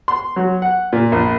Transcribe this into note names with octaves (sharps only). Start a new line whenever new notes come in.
C6
F#3
F#5
A#2
A#1